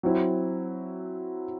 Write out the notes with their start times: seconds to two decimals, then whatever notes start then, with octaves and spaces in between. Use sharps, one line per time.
0.03 F#3 C4 E4